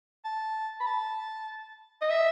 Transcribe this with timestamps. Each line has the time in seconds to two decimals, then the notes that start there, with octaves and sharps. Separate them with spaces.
0.25 A5
0.80 B5
0.87 A5
2.02 D#5
2.10 E5